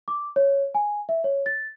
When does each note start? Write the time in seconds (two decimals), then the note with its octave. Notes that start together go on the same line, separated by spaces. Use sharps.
0.08 D6
0.36 C#5
0.74 G#5
1.09 E5
1.24 C#5
1.46 A6